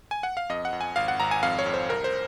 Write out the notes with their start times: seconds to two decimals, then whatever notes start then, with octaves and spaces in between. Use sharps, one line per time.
0.11 G#5
0.23 F#5
0.37 F5
0.49 F2 D#5
0.65 F#5
0.73 F2
0.81 G#5
0.96 G#1 F5
1.08 F#5
1.20 G#1 A#5
1.31 G#5
1.43 F2 F5
1.59 C#5
1.66 F2
1.74 C5
1.89 C2 A#4
2.04 C5